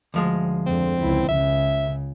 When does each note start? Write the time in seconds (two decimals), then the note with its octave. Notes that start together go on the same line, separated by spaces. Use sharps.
0.14 D2 F3 G#3
0.66 F2 D3 C4
1.00 C#2 E4
1.28 C#2 C#3 E5